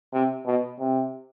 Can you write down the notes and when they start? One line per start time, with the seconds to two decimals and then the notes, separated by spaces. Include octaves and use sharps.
0.13 C3
0.46 B2
0.79 C3